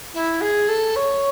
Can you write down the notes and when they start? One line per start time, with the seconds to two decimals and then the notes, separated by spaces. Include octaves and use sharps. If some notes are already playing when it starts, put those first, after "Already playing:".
0.14 E4
0.41 G#4
0.68 A4
0.96 C#5